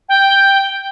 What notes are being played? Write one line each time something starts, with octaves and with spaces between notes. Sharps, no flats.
G5